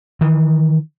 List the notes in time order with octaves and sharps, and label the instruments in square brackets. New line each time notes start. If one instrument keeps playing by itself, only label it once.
[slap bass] D#3 E3